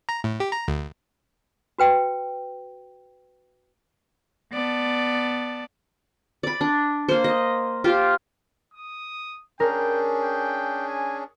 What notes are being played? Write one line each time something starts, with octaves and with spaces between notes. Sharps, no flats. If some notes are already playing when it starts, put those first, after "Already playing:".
A#5
A2
G4
A#5
D2
F#4 B4 G5
B3 D5 A5
D5 B5
D4
A#3 C5
D#5
F4 G4 C5
D#6
C#4 D4 G#4 A#4 G5
G5
G#5